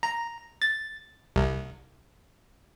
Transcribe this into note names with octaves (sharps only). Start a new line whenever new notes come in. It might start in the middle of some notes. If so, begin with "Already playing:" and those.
A#5
A6
C2